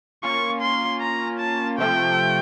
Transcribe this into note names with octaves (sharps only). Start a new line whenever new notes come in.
A#3 C#4 F4 C#6
C6
A#5
A5
C3 F3 A3 G5